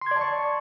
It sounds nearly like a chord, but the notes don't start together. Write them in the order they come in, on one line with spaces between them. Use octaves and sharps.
C6 G#6 D5 A5 C#6